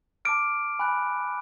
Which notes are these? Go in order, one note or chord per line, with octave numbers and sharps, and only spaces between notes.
A5 D6 F6 D7
G#5 B5 F#6